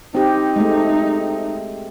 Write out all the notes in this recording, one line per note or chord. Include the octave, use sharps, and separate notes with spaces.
C4 D#4 G4
G#3 A3